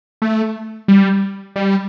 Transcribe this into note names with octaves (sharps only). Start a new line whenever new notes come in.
A3
G3
G3